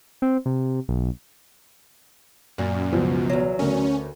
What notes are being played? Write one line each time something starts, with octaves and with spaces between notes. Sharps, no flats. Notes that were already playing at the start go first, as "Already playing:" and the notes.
C4
C3
B1
F#2 A#2
C#2 B2 F3
E2 F#3
D2 C#4 A#4